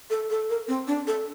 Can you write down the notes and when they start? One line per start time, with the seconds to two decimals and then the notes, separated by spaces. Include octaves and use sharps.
0.10 A4
0.30 A4
0.50 A#4
0.68 C4
0.87 D4
1.07 A4